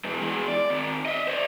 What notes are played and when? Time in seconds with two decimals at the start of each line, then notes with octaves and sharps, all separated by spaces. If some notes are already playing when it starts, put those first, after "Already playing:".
0.04 B2 E3
0.21 E3 G#3
0.48 D5
0.70 D#3 C4
1.06 D#5 E5
1.28 C5 D5